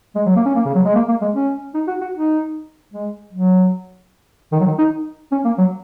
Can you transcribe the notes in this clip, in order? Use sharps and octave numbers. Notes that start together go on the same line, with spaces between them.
G#3
F#3
A#3
C#4
A#3
C#3
F#3
G#3
A#3
A#3
G#3
C#4
D#4
F#4
F#4
D#4
G#3
F#3
D#3
F#3
D#3
D#4
C#4
A#3
F#3